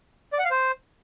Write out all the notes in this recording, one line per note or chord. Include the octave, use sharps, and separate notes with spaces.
D5
F#5
F5
C5